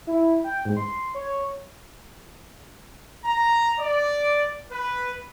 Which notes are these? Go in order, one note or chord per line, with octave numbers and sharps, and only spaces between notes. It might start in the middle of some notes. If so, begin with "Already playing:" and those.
E4
G5
G#2
C6
C#5
A#5
D5
B4